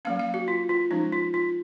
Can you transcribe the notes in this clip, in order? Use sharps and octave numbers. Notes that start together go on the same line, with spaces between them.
F#3 A#3 C#4 F5
F5
F#4
F4
F4
F3 G#3 C#4 D#4
F4
F4